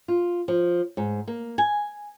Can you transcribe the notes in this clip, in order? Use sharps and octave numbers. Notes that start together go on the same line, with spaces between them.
F4
F3
G#2
A#3
G#5